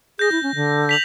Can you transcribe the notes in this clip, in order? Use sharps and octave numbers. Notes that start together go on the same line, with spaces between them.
G#4 G6 A#6
E4
C#4
D3
B6 F7 F#7